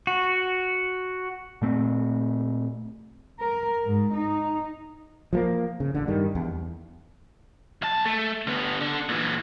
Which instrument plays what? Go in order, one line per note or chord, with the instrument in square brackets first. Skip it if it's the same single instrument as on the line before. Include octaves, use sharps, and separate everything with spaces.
[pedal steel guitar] F#4
[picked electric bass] A#2 A3 C4
[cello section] A#4
G#2
D#4
[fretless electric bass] F3 G#3 A#3
C#3
A1 D3
G2 D#3 G3
E2
[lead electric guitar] B1 A5
A3
D3 B3
D4 A4
A#2 E3